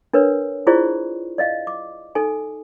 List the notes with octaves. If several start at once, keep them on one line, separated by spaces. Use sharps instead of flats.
D4 A#4 B4 C#5
E4 F4 G#4 C5 D5 C#6
D5 D#5 F5
D6
D#4 A4 G#5